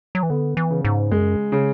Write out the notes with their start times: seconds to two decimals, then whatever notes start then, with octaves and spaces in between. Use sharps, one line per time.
0.15 F#3
0.23 E3
0.30 D3 B3
0.57 E3
0.71 C#3
0.85 G#2
1.11 F#2 G#3
1.52 C#3